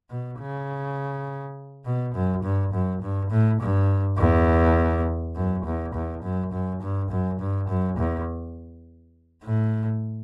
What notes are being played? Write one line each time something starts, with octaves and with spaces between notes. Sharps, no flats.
B2
C#3
B2
F#2
G2
F#2
G2
A2
G2
E2
F#2
E2
E2
F#2
F#2
G2
F#2
G2
F#2
E2
A2